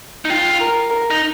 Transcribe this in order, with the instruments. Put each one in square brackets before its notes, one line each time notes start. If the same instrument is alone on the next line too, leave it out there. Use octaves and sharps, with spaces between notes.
[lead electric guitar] D#4
[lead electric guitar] F4 [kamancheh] G5
[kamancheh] A#4
A#4
[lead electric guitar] D#4